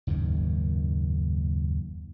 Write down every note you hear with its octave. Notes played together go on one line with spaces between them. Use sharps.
F#1 D#2 G#2 D#3